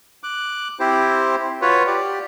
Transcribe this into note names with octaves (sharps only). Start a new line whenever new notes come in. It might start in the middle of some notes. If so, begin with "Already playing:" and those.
D6 F#6
C4 E4 G4 C5
F4 F#4 B4 C#5
G4 D5